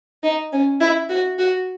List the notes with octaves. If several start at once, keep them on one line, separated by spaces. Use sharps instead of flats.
D#4
C#4
E4
F#4
F#4